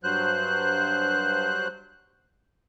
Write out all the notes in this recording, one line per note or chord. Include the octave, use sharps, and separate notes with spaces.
G2 F#3 C5 F#6